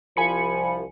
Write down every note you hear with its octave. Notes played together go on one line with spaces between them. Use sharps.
C2 F3 G#5 B5 C#7